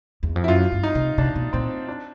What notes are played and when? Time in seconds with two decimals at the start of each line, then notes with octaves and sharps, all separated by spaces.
0.23 E2
0.36 F2
0.44 E4
0.48 F#2 F4
0.72 G2
0.83 D#4
0.95 C3
1.18 C3 D4
1.36 B2
1.53 A#2 C4
1.88 D4